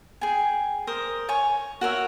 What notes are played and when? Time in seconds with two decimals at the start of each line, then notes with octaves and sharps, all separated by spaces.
0.21 G#4 G5 G#5
0.87 A#4 C5 D#6
1.29 C#5 G#5 C#6
1.81 F#4 A#4 C#5 E5